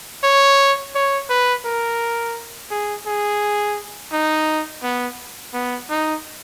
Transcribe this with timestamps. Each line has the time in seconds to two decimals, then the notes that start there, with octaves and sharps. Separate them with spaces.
0.23 C#5
0.95 C#5
1.30 B4
1.65 A#4
2.71 G#4
3.07 G#4
4.12 D#4
4.83 B3
5.53 B3
5.90 D#4